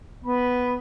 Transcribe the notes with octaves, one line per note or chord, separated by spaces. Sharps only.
B3 B5